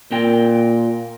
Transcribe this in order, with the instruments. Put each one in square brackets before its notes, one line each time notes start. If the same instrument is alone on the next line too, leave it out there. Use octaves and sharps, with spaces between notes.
[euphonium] A#2 [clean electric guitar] C4 A#4 G5